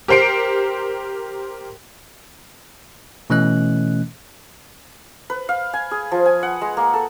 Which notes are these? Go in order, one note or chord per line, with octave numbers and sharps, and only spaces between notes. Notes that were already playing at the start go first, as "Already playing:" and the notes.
G4 A#4 C5 C7 D7
B2 E3 A3 C#4 D#5 F#6
B4
F5
G#5
G#4
F3
G#5
F#5
G#3
A#3
A4